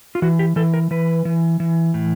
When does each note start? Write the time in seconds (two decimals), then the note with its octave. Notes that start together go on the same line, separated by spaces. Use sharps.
0.15 F4
0.22 E3 F#4
0.39 G4
0.56 E3 A4
0.74 A#4
0.91 E3 B4
1.25 E3
1.60 E3
1.94 A2